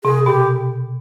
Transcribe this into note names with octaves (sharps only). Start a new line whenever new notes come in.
C3 G#4
B2 G4